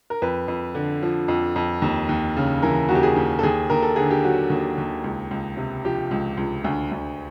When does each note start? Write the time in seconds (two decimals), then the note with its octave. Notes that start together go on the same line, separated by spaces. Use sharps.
0.10 A#4
0.22 F2 B4
0.48 F2
0.75 D3
1.02 F3
1.28 F2
1.56 F2
1.82 D#2
2.09 D#2
2.37 C#3
2.62 E3 A#4
2.89 D#2 F#4
2.95 G4
3.03 G#4
3.16 D#2
3.39 A4
3.43 D#2 G#4
3.70 D#2 A#4
3.82 A4
3.96 D3 G#4
4.10 G4
4.24 F#3 F#4
4.50 D#2
4.78 D#2
5.04 C#2
5.31 C#2
5.57 C3
5.84 F3 G4
6.11 C#2
6.37 C#2
6.64 D2
6.92 D2